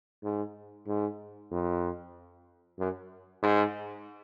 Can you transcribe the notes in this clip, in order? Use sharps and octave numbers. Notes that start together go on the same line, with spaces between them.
G#2
G#2
F2
F#2
G#2